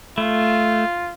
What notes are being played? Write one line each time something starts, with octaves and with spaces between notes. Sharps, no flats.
A3 F4